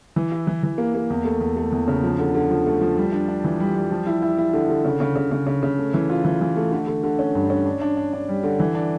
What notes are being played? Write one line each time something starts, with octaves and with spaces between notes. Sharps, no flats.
E3
E4
E3
E3
A#3
A#3
E2
A3
E2
A3
E2
C#3
F3
D3
D3
F3
A3
F3
G3
D4
D4
E3
G3
G3
F3
E4
E4
E4
D3
D3
C#3
C#3
C#3
C#3
C#3
C#3
A3
E3
F4
E3
E3
A3
D3
D3
D3
C#4
G2
C#4
D4
D4
D4
D4
G3
D3
E3
D4